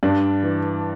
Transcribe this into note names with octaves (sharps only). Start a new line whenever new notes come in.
G2 D4
E3